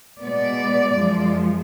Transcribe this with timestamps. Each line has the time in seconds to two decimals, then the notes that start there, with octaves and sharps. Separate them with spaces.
0.23 B2 G#3 B3 D5
0.97 F#2 F3 G#3